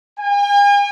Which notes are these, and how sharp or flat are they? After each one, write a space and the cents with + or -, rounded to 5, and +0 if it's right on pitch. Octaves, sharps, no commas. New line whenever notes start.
G#5 -45